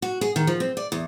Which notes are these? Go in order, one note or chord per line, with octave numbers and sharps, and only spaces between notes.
F#4
G#4
D#3
F3
C4
D5
E2